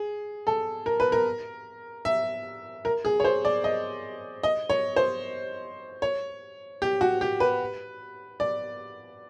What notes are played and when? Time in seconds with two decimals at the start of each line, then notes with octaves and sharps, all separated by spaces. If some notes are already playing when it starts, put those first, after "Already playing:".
Already playing: G#4
0.47 A4
0.86 A#4
1.00 B4
1.12 A#4
2.05 E5
2.85 A#4
3.05 G#4
3.20 C#5
3.24 C5
3.45 D5
3.64 D#5
4.43 D#5
4.70 C#5
4.96 C5
6.02 C#5
6.82 G4
7.01 F#4
7.21 G4
7.40 B4
8.40 D5